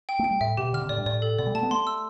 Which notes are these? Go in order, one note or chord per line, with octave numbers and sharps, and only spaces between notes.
G5
A3
G5
G3
A2 E5
B2 G4
D3 F6
C3
A2 D5
G2
A2 D5
A4
B2 D5
G3
A3 A5
B3
A3 C6
E6